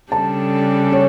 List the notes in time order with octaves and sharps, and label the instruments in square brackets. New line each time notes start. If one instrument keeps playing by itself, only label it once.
[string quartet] C#3 G3 D4 A4 [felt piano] A5
[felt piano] C#5